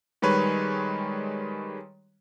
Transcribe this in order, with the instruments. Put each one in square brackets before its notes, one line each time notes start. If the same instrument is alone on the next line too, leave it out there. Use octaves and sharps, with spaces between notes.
[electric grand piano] D#3 G3 G#3 B4 C#5